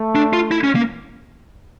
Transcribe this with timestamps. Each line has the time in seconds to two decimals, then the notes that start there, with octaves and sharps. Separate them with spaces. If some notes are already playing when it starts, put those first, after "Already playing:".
Already playing: A3
0.15 D4
0.33 F4
0.51 E4
0.64 C#4
0.75 A#3